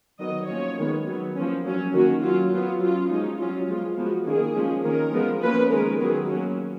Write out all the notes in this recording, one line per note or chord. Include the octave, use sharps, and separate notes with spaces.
D#3 F#3 B3 D#5
F3 A#3 C#4 C#5
D#3 G#3 B3
F#3 B3
F3 A#3 C#4
F#3 C#4
D#3 A#3 C#4 F#4
F#3 C#4 F4
F#3 B3 F4
F#3 C#4 F4
F3 G#3 C#4 D#4
F#3 C#4 F4
F3 G#3 B3 F4
F3 G#3 B3 F#4
D#3 A#3 C#4 G#4
F3 G#3 C#4
D#3 A#3 C#4 A#4
F3 G#3 B3
F3 A#3 C#4 B4
D#3 G#3 C#4 A#4
D#3 F#3 B3 G#4
F#3 A#3 C#4 F#4